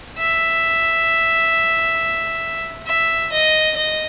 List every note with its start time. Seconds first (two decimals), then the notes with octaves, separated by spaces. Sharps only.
0.18 E5
2.87 E5
3.32 D#5
3.77 D#5